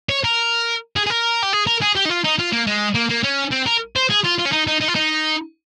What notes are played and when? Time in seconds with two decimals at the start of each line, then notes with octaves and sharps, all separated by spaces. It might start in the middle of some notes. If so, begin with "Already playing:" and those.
0.09 C#5
0.24 A#4
0.96 G#4
1.06 G#4
1.10 A#4
1.43 G4
1.53 G#4
1.67 A#4
1.82 G#4
1.95 G4
2.05 D#4
2.09 F4
2.24 D#4
2.39 F4
2.52 A#3
2.67 G#3
2.95 A#3
3.10 A#3
3.24 C#4
3.52 C4
3.66 A#4
3.96 C5
4.10 G#4
4.24 F4
4.39 F4
4.45 C#4
4.52 D#4
4.67 D#4
4.81 D#4
4.88 F4
4.95 D#4